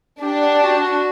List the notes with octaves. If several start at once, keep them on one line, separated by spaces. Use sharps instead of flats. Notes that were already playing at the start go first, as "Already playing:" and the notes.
D4 G4
F#5
F#4
F#4